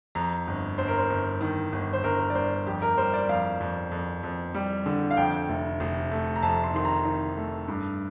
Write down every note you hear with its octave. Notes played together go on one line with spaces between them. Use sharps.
F2 A#5
G1
G1 C5
A#4
C5
G1
D#3
G1
C5
G1 A#4
A#4
D5
G1 C5
F2 G4
A#4
G3 C5
D5
F2 F5
F2
F2
F2
G3
D3
F5
F2 G5
F1
F1
A3
A#5
F2 A5
C6
D#3 C6
A#5
D#3
A3
G2